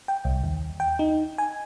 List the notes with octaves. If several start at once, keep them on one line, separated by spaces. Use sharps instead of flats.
G5
C2
D#2
G5
D#4
G#5